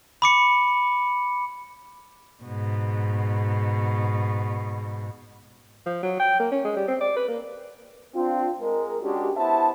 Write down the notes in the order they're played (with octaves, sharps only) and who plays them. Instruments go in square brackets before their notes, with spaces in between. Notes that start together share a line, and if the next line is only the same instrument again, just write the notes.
[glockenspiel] B5 D6 C#7
[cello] G#2 B2
[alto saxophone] F3
F#3
G5
A#3
C#4
G#3
G3
C4
D5
B4
A#3
[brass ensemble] C4 D4 F4
G#3 A#4
G#3 C#4 D4 F#4 G4
B3 E4 C5 E5 A5